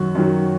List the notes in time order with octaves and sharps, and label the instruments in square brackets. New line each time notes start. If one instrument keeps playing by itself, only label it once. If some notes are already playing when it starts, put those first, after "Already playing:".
Already playing: [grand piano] F#2 D#3 F#3 F#4
F#2 D#3 F#3